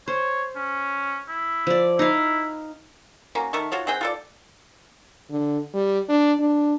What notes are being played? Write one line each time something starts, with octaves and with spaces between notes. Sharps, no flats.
C5 C#5
C#4
E4
F3 D5
D#4 E4 F5
A#3 C#4 F#4
D#3 A3 A4 C#6
F4 F#4 C#5
C4 G#4 F#5 G5
F4 A4 D5
D3
G3
D4
D4